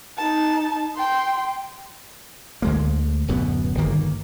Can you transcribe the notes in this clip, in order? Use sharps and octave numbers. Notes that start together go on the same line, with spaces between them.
D#4 A5
G5 C6
D2 G#3 A#3
D1 F#2 B2 B3
G1 D#3 A#3